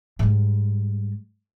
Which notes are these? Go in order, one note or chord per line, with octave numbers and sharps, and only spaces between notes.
G#2 G3